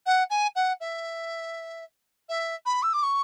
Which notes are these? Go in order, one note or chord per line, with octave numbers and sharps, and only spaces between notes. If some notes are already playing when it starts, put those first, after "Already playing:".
F#5
G#5
F#5
E5
E5
B5
E6
D6
C#6